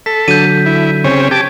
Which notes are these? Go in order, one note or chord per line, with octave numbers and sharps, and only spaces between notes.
A4 B6
D3 F#3 G6 D#7
E4
C#3 C4 C#5
G4 A5 D6 G#6